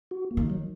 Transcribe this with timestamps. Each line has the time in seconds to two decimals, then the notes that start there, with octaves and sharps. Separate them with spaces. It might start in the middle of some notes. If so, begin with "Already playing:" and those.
0.11 F#4
0.31 A#3
0.37 D#3
0.50 F#3